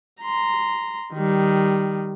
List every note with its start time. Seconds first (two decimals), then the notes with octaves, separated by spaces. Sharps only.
0.22 A#5 C6
1.14 D#3 G3